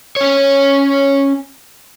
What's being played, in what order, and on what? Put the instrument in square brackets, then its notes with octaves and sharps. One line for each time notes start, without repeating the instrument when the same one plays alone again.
[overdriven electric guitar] C#4 C#5